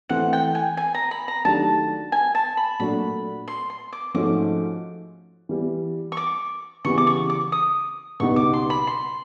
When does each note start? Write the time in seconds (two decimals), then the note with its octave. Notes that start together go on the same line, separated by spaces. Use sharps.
0.09 E3 A3 C4 F#5
0.33 G5
0.55 G#5
0.77 G#5
0.94 A#5
1.11 B5
1.28 A#5
1.45 D#3 F#3 A3 D4 G4 A5
2.12 G#5
2.35 A5
2.57 B5
2.79 A#2 F#3 A3 D4 F#4 B5
3.48 C6
3.70 C6
3.93 D6
4.14 G#2 F3 A3 C#4 F#4 D6
5.49 E3 G3 B3
6.12 C#6
6.17 D6
6.85 C#3 E3 G3 B3 C#6
6.98 D6
7.07 C#6
7.30 D6
7.52 D#6
8.20 C#2 B2 G3 B3 D#4 C#6
8.36 D6
8.53 C6
8.70 B5
8.87 C6